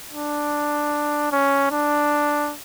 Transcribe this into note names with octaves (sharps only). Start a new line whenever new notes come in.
D4
C#4
D4